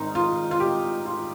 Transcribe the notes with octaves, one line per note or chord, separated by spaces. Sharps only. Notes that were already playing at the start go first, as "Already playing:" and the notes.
Already playing: G#1 G#2 D#3 D#4
F4
F4
G4
F4